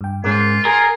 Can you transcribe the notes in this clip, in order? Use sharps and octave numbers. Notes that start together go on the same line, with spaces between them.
G2 G5
G#2 C#4 F4 G#4 A#4
G#4 A#4 A#5 G6